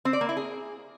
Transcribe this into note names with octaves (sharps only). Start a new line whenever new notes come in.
C4
D5
A#3
E4
G#4